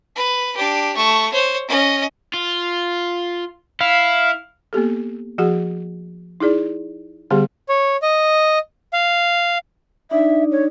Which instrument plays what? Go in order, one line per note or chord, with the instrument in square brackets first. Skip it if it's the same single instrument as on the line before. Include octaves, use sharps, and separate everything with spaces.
[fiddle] B4
D4 G4
A3 C#6
C5 C#5
C#4 D#5
[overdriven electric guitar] F4
[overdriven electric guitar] E4 [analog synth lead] F5
[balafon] A#3 B3 G4 A4
F3 F#4 G#4 F#5
D#4 E4 G#4 D5
D3 G3 B3 G4 G#4 F#5
[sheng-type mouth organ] C#5
D#5
F5
[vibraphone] D4 D#4 D5 [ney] E5
[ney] C#5